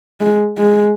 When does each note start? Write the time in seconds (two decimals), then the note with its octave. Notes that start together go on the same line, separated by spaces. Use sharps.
0.21 G#3
0.58 G#3